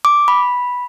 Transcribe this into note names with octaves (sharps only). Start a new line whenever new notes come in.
D6
B5